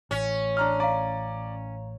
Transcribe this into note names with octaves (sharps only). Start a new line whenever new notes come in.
A1 C#4
D4 A#5 F6
D5 F5 A#5